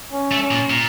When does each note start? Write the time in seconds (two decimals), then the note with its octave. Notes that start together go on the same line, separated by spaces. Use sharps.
0.12 C#4
0.31 A3
0.42 C#4
0.51 A#2
0.70 A#2